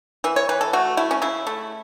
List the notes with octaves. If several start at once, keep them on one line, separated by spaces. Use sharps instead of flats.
E3 E5
C#5
E3 B4
A4
A3 F#4
A3 E4
C#4
C#3 E4
A3